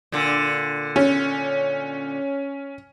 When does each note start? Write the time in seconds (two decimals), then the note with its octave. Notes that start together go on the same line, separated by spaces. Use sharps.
0.12 A#2 D3
0.96 C#4